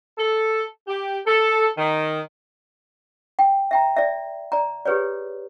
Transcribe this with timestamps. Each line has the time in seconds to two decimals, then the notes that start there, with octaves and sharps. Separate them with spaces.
0.18 A4
0.88 G4
1.27 A4
1.78 D#3
3.39 G5
3.71 E5 G5 A#5
3.97 D5 E5
4.52 D5 A#5
4.85 G4 G#4 B4 C#5 D5